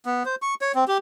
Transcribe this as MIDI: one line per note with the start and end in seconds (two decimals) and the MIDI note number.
0.06 0.23 59
0.25 0.35 72
0.42 0.54 85
0.61 0.72 73
0.75 0.84 60
0.88 0.98 67